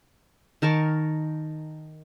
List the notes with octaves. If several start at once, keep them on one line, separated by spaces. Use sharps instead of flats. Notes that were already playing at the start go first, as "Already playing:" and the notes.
D#3 A#4 A5 C#6